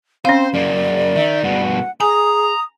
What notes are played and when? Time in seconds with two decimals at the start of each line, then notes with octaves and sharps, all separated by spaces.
0.25 C4 C#4 C5 F5
0.54 F#2 A#3 D5
1.16 D#3 E5
1.44 G2 B2 F#5
2.01 G#4 G#5 A#5 D#6